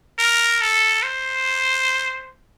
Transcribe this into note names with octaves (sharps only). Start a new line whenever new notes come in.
A#4
A4
C5